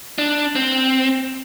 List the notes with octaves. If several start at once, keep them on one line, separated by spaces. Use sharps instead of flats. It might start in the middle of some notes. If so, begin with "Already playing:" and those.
D4
C4